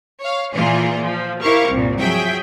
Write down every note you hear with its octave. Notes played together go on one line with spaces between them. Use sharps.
C#5 F5
A#2 E3 F3 F4 G#4
F3
E4 G4 A#4 C5 F5 C#6
C2 G2 A#2
F3 F#3 G#4 E5 G5 B6